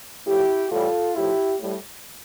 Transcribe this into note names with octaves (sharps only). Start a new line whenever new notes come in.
A2 F3 E4 G4
A2 E3 G3 F4 A4
A2 F3 E4 G4
A2 G3